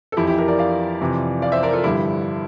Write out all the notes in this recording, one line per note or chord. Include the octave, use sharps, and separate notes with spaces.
A4
F2 E3 E4 G4
E4 G4
G4 A#4
A#4 D5
D5 F5
F2 C3 E3
D5 F5
C5 E5
A#4 D5
F4 A4
G2 D3 F3 E4 G4